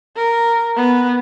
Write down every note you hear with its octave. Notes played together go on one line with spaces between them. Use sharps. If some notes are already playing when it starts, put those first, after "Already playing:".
A#4
B3